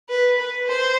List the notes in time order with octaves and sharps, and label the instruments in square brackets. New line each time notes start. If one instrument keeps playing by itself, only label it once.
[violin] B4
B4
C5